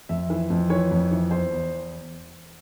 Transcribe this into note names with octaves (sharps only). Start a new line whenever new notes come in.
F2 E5
E3
F2
E3 C#5
F2
E3
E2 C5
E2